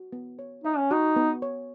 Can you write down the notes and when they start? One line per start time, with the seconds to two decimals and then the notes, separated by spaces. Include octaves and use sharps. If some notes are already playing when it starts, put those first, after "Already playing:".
Already playing: F#4
0.13 B3
0.39 C#5
0.64 D#4 E5
0.77 C#4
0.91 D#4 F#4
1.16 B3
1.42 C#5